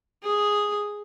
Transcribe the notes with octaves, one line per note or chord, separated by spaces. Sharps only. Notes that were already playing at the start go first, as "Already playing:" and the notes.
G#4 D#6